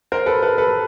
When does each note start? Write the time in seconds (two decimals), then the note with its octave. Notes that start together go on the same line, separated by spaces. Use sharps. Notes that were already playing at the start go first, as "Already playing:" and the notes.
0.12 A#4 C5
0.26 A4 B4
0.43 A4 B4
0.58 A4 B4